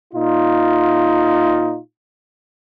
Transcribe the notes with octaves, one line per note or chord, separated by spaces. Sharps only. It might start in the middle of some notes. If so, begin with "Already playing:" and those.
A#2 D#4 F4